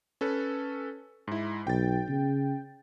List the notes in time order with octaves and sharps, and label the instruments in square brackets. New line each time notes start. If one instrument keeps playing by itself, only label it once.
[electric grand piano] C#4 A4 B4
G#2 E4
[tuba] B1 [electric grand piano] G5 A6
[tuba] C#3